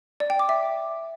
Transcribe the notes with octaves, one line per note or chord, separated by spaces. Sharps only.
D5
G5
D6
E5